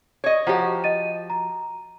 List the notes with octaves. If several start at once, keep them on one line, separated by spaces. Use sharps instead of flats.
C#5 D#5
F3 F#4 G4 C5 F#5 A#5
D#5 A6 D#7
A#5